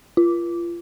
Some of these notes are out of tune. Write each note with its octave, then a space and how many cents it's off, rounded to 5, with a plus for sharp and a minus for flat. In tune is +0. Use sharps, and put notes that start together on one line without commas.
F4 -30